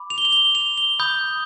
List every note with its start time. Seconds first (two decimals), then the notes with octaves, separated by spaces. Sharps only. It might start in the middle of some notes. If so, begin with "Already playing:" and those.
Already playing: B5 D6
0.10 F7
0.18 G7
0.25 F7
0.32 G7
0.55 F7
0.78 G7
0.99 B5 D#6 G6